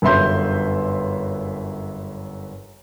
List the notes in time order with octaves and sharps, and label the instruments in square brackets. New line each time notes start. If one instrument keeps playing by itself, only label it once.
[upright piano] G1 F#2 B4 E5 C6 G6